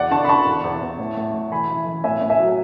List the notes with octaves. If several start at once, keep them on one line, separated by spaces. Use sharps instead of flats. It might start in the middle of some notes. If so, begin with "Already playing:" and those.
Already playing: E2 D5 F#5
D3 A5 C#6
B5
D3 A5 C#6
E2
E2
E2
A2
A2
A2
E3 G#5 B5
E3
E3
A2 E5 G#5
A2
E5 G#5
F#3